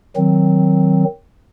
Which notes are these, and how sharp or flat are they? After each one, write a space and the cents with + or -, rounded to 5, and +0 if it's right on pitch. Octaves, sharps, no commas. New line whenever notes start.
D#3 +0 F#3 +0 C4 +0